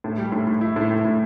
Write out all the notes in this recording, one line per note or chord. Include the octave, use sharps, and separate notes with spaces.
A2
G3
A2
A2
E4
A2
A2
A2